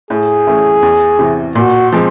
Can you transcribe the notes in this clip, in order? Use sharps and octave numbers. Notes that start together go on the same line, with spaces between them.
A2 G#4
E3 A3 C#4
E2
C3 E3
A#2 F#4
F3 G#3 C4